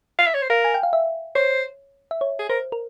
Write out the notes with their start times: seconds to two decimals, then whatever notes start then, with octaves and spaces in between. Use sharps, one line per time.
0.19 F5
0.27 E5
0.34 C#5
0.42 C5
0.50 A#4 F5
0.64 G#5
0.74 G5
0.83 F5
0.93 E5
1.35 C5 C#5
2.11 E5
2.21 C#5
2.39 G#4
2.49 A#4 C5
2.72 A#4